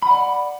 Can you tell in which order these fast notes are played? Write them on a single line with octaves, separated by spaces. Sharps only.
B5 F#5 D5